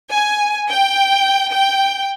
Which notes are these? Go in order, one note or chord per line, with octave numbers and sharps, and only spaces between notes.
G#5
G5
G5